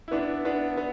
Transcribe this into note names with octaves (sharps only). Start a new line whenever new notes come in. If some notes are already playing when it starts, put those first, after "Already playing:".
E4
B3 D4
B3 D4
B3